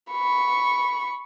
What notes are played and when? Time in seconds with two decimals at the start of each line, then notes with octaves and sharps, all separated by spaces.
0.12 B5 C#6